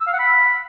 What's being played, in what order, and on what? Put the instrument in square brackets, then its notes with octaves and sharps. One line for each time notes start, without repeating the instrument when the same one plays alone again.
[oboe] E6
F5
F#5
B5